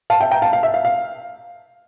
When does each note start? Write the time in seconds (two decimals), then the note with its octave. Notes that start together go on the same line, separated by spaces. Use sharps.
0.10 F5 A5
0.21 E5 G5
0.31 G5 A#5
0.42 F5 A5
0.53 F5
0.63 E5
0.74 F5
0.85 F5